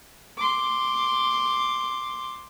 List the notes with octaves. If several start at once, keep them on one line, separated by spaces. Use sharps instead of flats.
C6 D6